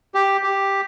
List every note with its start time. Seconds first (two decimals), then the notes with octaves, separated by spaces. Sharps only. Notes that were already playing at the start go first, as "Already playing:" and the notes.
0.14 G4
0.43 G4